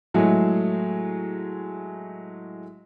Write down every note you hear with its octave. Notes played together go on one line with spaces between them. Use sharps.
A2 F#3 G#3 A3 F#4 G#4